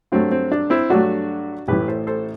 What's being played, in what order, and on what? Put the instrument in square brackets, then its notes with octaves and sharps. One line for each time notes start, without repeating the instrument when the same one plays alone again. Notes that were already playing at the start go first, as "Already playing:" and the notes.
[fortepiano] G2 F#3 A3 C4
C4
D4
C4 E4
G2 F#3 A3 D4 F#4
A1 A2 E3 G4 B4
A4 C5
A4 C5